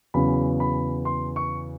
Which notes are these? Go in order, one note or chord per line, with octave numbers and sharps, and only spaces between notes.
E2 C#3 F#3 B5
B5
C6
C#6